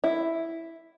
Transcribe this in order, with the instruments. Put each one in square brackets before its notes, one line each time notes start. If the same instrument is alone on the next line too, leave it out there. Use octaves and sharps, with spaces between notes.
[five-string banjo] E4